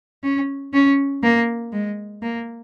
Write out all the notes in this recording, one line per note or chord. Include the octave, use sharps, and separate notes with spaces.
C#4
C#4
A#3
G#3
A#3